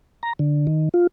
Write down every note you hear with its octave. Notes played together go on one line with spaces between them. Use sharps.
A#5
D3
D#3
F4